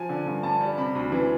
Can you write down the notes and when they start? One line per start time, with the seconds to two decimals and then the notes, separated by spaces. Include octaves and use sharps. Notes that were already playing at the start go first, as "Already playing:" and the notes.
Already playing: F3 G#5
0.09 D3
0.26 G2
0.43 G2 A5
0.61 G3
0.78 C3 B5
0.95 D2
1.12 E3